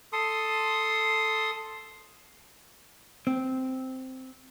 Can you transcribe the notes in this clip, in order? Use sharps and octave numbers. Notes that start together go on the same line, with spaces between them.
A4 C6 D#6
C4